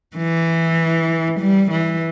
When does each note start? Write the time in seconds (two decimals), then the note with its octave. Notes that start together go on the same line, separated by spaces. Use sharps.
0.16 E3
1.40 G3
1.71 E3